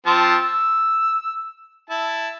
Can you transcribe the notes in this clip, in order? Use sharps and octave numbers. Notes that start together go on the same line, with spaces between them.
F3 C4 A5
E6
E4 A5